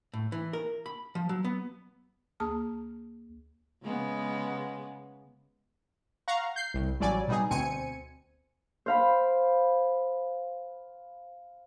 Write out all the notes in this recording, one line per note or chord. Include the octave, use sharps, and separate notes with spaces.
A2
E3
A#4
B5
F3
F#3
B3
D2 A#3 G#4 A5 D#6 F6
C#3 G#3 B3
F5 F#5 A#5 C#6
G6 C7
C2
A1 E3 F#3 G3 D5 G#5
B2 G3 B3 D#4 G#4
D2 B2 C4 G#5 C#7 D#7
C5 F5 B5